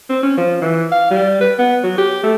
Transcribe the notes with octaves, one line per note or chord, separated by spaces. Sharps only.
C4
C#4
F3
E3
F5
G3
B4
B3
F#3
G4
A3